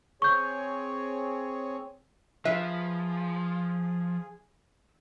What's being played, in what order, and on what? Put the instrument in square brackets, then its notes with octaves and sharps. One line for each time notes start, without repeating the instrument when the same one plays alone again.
[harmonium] C4 G#4 C#5 [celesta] C#6 G6
[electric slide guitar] F3 [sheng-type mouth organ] G#4 [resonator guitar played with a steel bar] B4 E5 F5